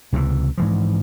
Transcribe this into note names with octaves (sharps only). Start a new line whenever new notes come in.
C#2 C3 D#3 E3
G#2 E3 F3